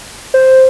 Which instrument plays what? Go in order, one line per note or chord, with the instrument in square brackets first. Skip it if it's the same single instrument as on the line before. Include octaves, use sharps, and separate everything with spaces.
[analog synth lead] C5